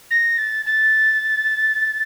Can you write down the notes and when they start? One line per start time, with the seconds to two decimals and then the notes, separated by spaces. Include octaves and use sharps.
0.10 A#6
0.38 A6
0.65 A6